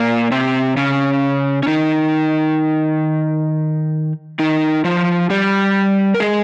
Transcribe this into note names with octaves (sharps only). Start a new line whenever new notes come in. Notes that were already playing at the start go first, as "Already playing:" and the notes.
Already playing: A#2 A#3
C3 C4
C#3 C#4
C#4
D#3 D#4
D#3 D#4
F3 F4
G3 G4
A#4
G#3 G#4